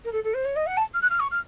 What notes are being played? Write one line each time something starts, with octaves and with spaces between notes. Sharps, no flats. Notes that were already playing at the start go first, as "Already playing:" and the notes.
A#4
A4
A4
C5
C#5
D#5
F#5
A5
F6
F#6
F6
C#6
F6